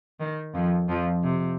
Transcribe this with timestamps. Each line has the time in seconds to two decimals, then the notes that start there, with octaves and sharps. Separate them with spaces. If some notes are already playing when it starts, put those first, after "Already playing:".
0.20 D#3
0.55 F2 F3
0.89 F2 F3
1.24 C3